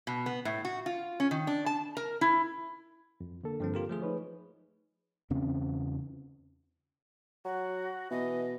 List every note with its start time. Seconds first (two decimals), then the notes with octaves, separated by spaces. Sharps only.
0.07 B2
0.26 B3
0.45 A2
0.65 F#4
0.86 F4
1.20 C#4
1.31 D#3
1.47 D4
1.66 A5
1.97 A#4
2.21 E4
3.20 F2
3.43 D3 A#3 A4
3.60 G2 F3 C4
3.74 F4 G4 A#4
3.89 F3 A3 G#4
4.02 D#4 B4 C#5
5.30 E2 C#3 C4 C#4
7.45 F#3 F#4
8.11 B2 E3 D#5